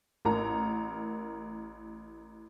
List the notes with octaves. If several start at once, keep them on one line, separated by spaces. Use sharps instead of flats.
A1 A#4 A#5